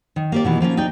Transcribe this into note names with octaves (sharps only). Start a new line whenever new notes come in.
D#3
A#3 G4 D5
B2 D#3 E3
F3 A#3 C#4 F4
D#4 D5 G5